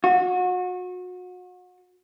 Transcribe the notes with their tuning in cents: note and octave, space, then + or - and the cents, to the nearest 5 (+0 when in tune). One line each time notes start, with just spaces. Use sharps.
F#4 -35